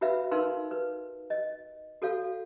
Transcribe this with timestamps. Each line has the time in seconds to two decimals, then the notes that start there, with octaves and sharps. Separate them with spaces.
0.01 F4 F#4 B4 E5 F5
0.31 D#4 A#4 B4 F5 C6
0.71 B4
1.30 D#5
2.02 F#4 A4 C#5 F5